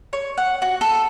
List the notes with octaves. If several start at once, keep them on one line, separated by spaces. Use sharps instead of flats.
C#5
F#5
F#4
A4